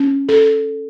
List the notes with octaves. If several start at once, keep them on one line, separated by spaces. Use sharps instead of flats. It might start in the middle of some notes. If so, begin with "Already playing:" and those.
Already playing: C#4
A4